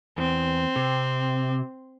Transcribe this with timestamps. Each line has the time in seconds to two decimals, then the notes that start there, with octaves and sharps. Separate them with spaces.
0.18 E2 C4
0.76 C3